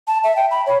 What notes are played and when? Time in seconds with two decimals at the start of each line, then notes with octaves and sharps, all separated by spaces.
0.08 A5
0.24 E5
0.36 G5
0.51 B5
0.66 C#5